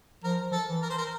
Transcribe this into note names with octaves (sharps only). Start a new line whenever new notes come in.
F3 A#4
F3 A4
E3
A#4
C5
A#4